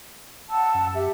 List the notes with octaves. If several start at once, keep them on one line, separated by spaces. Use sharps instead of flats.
F#5 A5 E6
F#2
G4 E5